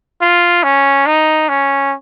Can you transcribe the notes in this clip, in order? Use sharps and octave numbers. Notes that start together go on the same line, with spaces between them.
F4
C#4
D#4
C#4